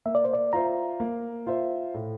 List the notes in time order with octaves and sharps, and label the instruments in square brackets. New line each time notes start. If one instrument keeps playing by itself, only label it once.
[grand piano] A#3 [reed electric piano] E5
[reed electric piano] D5
C5
D5
[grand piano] F4 C5 E5 [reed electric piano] A#5
[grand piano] A#3
F4 C5 E5
A2